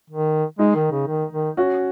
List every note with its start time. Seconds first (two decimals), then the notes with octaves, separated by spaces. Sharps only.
0.10 D#3
0.59 G#3 D#4
0.75 D#3
0.92 C#3
1.08 D#3
1.33 D#3
1.57 C#4 F#4